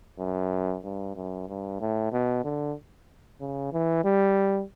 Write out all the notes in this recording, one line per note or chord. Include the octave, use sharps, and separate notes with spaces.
F#2
G2
F#2
G2
A2
B2
D3
C#3
E3
G3